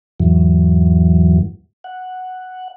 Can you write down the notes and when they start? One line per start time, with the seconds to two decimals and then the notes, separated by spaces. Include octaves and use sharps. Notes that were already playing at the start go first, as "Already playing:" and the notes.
0.20 E2 G#2 E3 F#3
1.84 F#5